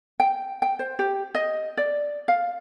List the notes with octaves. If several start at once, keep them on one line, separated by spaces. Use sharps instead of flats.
G5
G5
C5
G4
D#5
D5
F5